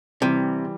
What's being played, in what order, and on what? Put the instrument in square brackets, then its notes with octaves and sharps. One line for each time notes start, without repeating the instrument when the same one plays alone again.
[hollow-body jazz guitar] C3 [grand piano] E3 G3